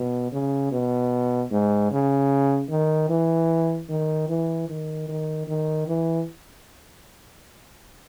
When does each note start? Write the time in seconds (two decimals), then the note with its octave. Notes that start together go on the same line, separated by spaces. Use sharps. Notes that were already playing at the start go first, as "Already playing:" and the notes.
Already playing: B2
0.32 C#3
0.72 B2
1.51 G#2
1.91 C#3
2.70 D#3
3.09 E3
3.89 D#3
4.29 E3
4.68 D#3
5.08 D#3
5.47 D#3
5.87 E3